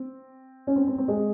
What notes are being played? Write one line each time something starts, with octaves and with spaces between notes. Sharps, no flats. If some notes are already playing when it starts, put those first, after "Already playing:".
Already playing: C4
C#4
C4
C4
C4
G#3